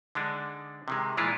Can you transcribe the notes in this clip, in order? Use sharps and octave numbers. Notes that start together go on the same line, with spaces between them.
D3 G#3 D4 D#4
C3 D#3 G#3
A#2 E3 G#3 D4 E4 F4